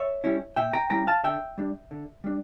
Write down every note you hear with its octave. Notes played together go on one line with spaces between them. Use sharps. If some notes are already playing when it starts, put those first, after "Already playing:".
Already playing: C#5 E5
G3 C#4 E4
A#2 E5 G5
G5 A#5
G3 C#4 E4 G5 A#5
F5 A5
D3 E5 G5
G3 D4
D3
G3 D4